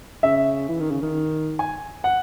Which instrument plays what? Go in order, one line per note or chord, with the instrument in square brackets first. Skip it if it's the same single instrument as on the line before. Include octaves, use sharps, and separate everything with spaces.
[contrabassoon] C#3 [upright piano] E5
[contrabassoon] E3
D#3
C#3
D#3
[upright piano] G#5
F#5